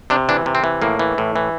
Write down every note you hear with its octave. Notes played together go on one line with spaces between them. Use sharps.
C3 D4
E3 D4
C3
C4
E3
A2 A#3
E3
A2
E3